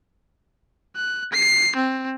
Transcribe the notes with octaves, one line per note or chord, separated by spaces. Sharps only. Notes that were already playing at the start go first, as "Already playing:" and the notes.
F#6
C7
C4